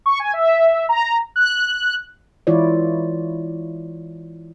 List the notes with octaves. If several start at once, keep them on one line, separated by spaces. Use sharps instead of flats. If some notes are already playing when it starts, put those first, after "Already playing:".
C#6
G#5
E5
A#5
F#6
E3 G#3 E4 F4 C#5 D5